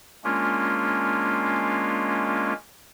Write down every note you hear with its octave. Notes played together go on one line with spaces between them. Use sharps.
G#3 A#3 C#4 D4 F4